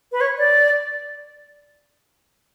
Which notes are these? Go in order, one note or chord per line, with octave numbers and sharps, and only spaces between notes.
B4
C#5
D5